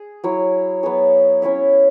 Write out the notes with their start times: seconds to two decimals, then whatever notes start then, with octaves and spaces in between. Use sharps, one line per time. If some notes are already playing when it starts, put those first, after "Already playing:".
Already playing: G#4
0.24 F#3 E4 C#5
0.83 F#3 B3 G#4 C#5
1.42 C#4 E4 C#5 E5